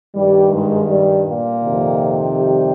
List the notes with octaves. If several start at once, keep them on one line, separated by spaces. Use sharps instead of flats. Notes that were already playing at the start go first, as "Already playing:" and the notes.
G2 D#3 G3
G#2 G#3
G3
A#2 A#3
F2 C3 D#3
G3 G4